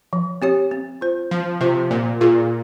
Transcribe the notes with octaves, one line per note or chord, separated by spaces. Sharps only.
F3
C4 G4 C#5
C4
F4 C5
F3 C4
C3 F4 C5
A#2 A#3
A#2 F4 G#4